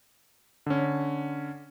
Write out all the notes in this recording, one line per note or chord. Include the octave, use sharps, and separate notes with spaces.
D3 C#4